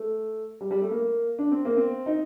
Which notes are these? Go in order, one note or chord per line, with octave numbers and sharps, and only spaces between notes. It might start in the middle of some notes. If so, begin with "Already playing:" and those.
Already playing: A3
G3
G3
A3
A#3
D4
C4
A#3
C4
D#4